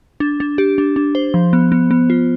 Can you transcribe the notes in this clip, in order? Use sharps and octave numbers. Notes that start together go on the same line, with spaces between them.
D4
D4
G4
D4
D4
C5
F3
B3
B3
B3
F4